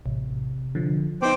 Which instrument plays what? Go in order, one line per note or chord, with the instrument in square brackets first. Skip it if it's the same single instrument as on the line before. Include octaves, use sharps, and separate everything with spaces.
[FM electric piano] A1 [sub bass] C3
[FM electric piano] D3 F3
[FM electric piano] B3 D#4 [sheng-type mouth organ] C5 G5 D6